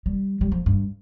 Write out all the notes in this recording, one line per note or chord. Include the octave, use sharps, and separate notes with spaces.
G3
G3
F3
G2